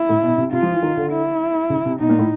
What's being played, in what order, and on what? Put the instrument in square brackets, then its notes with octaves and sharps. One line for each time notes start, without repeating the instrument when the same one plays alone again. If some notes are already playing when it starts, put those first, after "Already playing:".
Already playing: [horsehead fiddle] E4
[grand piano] A2
B2
C3
[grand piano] C3 [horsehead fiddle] F4
[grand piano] F3
E3
D#3
D3
[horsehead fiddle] E4
[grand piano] C#3
C3
[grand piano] B2 [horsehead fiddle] D#4
[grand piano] A#2
A2